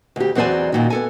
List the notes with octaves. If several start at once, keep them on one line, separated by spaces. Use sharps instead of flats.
D2 G4
E2 F#3 C4 C5 D5 G#5
F#2 A#2 D#3
B3 A4 G#5